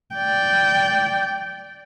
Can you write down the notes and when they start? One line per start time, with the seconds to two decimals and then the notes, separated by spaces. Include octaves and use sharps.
0.15 D5 G5